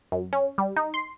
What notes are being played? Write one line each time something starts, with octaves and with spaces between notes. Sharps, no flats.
F#2
C#4
G3
D#4
C6